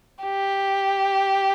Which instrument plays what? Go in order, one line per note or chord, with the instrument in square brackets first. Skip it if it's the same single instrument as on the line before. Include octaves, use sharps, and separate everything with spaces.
[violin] G4